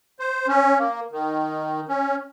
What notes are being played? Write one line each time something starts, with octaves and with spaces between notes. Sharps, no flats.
C5
C#4
A#3
D#3
C#4